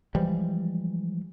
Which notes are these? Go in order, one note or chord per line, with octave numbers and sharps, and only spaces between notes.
E3 F3 G3 G#3